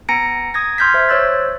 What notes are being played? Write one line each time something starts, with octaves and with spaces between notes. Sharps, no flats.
B3 G#5 A#5 A#6 C#7 D7
D#6 G#6 A#6
C6 F6 G6 G#6 B6
C5 E5
C5 C#5 E6 F#6 A6